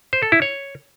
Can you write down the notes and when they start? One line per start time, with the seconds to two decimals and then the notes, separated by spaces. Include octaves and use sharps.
0.13 C5
0.22 A4
0.32 E4
0.42 C#5